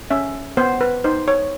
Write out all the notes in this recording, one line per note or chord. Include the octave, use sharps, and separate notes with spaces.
C#4 E5
B3 C5
B4
D#4 C5
C#5